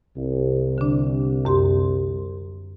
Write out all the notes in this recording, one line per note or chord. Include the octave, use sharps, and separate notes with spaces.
C2
D3 D4
F#2 G4 C6